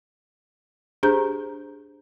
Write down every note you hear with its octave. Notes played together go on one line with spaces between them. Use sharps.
D4 G4 G#4 C5 A#5 G6